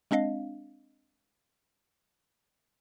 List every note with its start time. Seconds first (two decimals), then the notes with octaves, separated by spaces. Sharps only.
0.11 G#3 C4 D4 D#5 F5